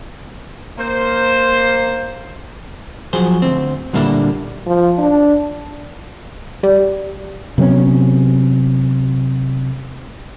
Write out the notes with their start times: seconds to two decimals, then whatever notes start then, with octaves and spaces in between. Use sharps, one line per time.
0.78 A#3 C5
3.13 F3 F#3 G#4 C5
3.42 D2 C4
3.93 A#2 D3 G3 A#3 D4 E4
4.66 F3
4.98 D4
6.63 G3
7.58 C3 F#3 B3 C#4